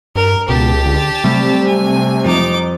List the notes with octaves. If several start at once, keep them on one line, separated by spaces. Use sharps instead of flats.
G2 A#4
C#2 B2 G4 A5
D3
C3 G3 A3
G#5
F2 D#4 D6